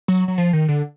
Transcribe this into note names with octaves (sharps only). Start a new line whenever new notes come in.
F#3
F#3
F3
D#3
D3